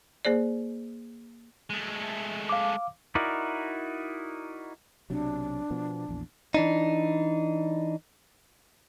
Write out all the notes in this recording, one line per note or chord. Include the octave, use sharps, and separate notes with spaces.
A#3 G#4 C5 D5
G#3 A3
F5 D6
D#4 E4 F#4 A#4 D5
B1 C3 F#3 D4
B2 F3 B3
A#1 E2
E3 D4 D#4